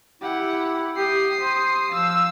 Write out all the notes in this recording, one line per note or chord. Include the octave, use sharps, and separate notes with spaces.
E4 G4 F#5
G4 D#6 C7
C5
F3 F5 E6